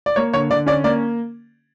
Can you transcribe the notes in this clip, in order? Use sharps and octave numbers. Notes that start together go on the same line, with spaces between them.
D5
A#3 C#5
D3 C#5
D3 D5
C#4 D5
A#3 D5